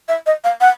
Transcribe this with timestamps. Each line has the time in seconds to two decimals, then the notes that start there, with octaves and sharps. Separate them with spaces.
0.08 E5
0.27 D#5
0.44 F5
0.61 F#5